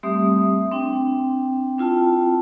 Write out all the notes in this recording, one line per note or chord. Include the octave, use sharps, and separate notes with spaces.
G3 A3 C4 G4 E5 D#6
C4 D4 G5
C4 E4 F4 G5 A5